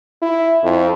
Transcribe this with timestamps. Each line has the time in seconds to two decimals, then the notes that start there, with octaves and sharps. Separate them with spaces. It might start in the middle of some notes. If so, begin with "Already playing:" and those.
0.22 E4
0.63 F2